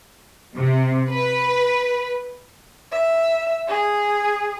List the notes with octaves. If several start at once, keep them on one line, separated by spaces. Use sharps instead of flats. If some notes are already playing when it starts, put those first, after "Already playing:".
C3
B4
E5
G#4